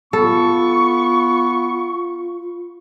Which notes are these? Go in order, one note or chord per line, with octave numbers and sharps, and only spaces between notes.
B3 F4 A4 C#6